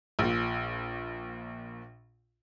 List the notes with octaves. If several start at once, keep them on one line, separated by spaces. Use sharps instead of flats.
A#1 A#2